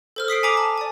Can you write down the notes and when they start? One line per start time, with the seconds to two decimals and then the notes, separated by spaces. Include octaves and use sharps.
0.16 A4 C5 F6
0.28 D#6 B6 C7 D7
0.43 G#5 A#5 D6 F#7
0.57 A5
0.78 D5 G#5